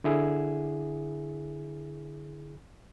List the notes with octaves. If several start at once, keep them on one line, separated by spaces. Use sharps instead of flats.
D3 E4 G#4